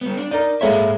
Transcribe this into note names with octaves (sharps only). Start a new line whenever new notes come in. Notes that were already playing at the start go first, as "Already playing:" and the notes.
G3 B3
D4
D#4 A#4 D5
G#2 G#3 A#3 A4 C#5 E5